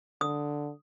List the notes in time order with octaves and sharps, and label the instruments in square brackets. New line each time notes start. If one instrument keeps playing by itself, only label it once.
[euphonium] D3 [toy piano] D#6